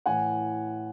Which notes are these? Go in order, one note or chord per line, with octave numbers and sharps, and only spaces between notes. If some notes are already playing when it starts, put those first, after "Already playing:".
A2 E3 F#5 G#5